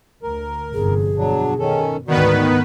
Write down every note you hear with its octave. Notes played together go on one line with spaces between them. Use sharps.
D2 A#4
G1 F2 C3 G#4
B2 F#3 D4
D#3 C#4 A4
D2 G#2 D3 D#3 B3 F#4 B4 D5